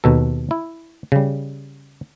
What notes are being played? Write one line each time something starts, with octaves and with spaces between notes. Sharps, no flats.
D#2 B2 A4
E4
C#3 G3